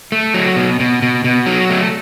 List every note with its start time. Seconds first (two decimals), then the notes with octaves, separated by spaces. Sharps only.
0.12 A3
0.34 F#3
0.56 B2
0.80 B2
1.02 B2
1.24 B2
1.46 F#3
1.70 A3